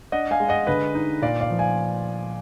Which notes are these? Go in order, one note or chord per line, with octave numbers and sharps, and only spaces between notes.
D4 D#5 F#5
F5 G#5
G#3
D#5 F#5
D3 B4 D#5
D#4
A#2 D5 F5
D5 F5
F3
F5 G#5